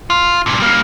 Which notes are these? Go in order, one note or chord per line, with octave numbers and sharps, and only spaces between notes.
F4
G2 A#2
G3 A#3